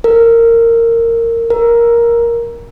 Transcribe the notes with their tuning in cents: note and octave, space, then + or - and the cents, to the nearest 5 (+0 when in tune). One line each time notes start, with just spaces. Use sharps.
A#4 -20
A#4 +10